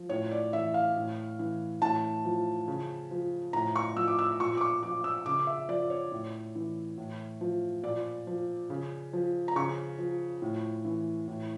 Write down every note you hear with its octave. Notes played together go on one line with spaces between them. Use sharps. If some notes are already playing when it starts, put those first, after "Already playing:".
Already playing: F3
A2 C#5
D5
E3 E5
F5
A2
E3
A2 A5
F3
C#3
F3
A2 A#5
C#6
F3 E6
D6
E6
A#2 C#6
D6
C#6
F3 D6
E6
C#3 D6
E5
F3 D5
C#5
A2
E3
A2
F3
A#2 D5
F3
C#3
F3
A#5
C#3 C#6
F3
A2
E3
A2